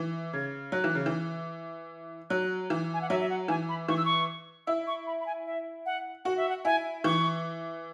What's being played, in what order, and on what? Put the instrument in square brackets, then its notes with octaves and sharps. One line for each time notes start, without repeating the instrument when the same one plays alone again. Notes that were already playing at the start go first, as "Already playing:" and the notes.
Already playing: [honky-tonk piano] E3
[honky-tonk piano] C#3 [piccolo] G#6
[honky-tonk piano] F#3 [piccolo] F#6
[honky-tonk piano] E3
C#3
E3
[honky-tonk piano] F#3 [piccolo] F#6
[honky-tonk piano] E3
[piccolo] G#5
F#5
[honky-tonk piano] F#3 [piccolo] E5
[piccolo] E5
F#5
[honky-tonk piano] E3 [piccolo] G#5
[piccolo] B5
[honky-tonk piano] E3 [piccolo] C#6
[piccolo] E6
C#6
[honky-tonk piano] E4 [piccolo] E6
[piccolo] C#6
B5
B5
G#5
E5
F#5
[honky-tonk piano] F#4 [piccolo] F#5
[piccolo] E5
F#5
[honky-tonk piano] E4 [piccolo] G#5
[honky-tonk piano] E3 [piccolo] C#6